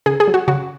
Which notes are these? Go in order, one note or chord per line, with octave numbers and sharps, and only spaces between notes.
C#3 G#4
G#4
F#3
F#4
C#3 F#4